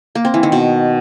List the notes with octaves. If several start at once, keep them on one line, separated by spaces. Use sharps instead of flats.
A#3
C4
E3
D#3
B2